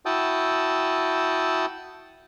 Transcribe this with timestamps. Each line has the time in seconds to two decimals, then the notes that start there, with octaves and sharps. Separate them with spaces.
0.06 E4 F#4 G5 A5 D#6 E6